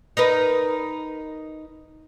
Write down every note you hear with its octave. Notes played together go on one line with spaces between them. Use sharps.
D#4 A#4 B4